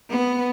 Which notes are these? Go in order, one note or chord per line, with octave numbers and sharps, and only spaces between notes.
B3